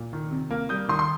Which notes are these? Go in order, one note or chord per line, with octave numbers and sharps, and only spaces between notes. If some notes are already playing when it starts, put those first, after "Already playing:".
Already playing: A#2
D#3
C3
A#3
G3 D#6 G6
D#3 C6 D#6
C6